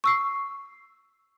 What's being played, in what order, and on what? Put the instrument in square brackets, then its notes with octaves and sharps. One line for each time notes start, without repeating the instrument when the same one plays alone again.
[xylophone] C#6 E6 C7